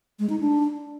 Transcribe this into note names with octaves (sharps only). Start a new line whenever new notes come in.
G#3
D#4
D4